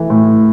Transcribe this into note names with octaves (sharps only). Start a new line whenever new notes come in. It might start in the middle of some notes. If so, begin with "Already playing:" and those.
Already playing: E3 A3
A2